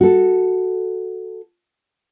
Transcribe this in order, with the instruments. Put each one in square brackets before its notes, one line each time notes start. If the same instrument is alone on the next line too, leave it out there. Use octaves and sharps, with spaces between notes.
[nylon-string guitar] F#4 A4